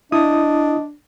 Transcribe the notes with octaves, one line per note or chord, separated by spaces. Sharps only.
D4 E4 D#5 D#6